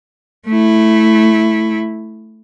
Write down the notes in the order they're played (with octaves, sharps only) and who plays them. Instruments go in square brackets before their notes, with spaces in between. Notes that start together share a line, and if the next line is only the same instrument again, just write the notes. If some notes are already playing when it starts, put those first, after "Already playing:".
[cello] A3 E4